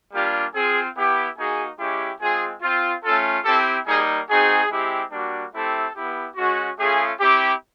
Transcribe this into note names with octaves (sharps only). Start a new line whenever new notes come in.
G3 A#3 D4 F4 G4
C4 F4 G#4
B3 E4 G4
A#3 D#4 F#4 G#4
G#3 C#4 E4 G4
G#3 C4 F4 G#4
C4 F4
A3 C#4 F4 A4
C4 E4 G4 A4
G3 A#3 D#4 G#4
C4 D#4 F#4 G#4
G#3 C4 E4 G4
G3 A#3 D4 F#4
A3 C4 E4 G4 A4
B3 E4 G4
G#3 C#4 F#4
A3 C#4 F4 G#4
C4 E4 G4